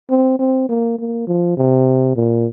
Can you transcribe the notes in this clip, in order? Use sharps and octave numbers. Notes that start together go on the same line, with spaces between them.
C4
C4
A#3
A#3
F3
C3
A#2